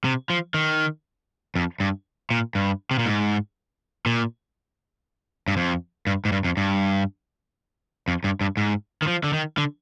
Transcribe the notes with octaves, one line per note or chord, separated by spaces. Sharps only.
C3
F3
D#3
F2
G2
A#2
G2
C3
A#2
G#2
A#2
G2
F2
G2
G#2
G2
F2
G2
F2
G2
G2
G#2
D#3
F3
D3
D#3
D3